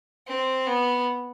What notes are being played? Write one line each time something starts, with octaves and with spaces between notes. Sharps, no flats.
C4
B3